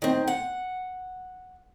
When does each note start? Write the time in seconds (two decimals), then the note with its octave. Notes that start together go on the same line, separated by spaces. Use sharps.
0.02 D#3 C4
0.27 F#5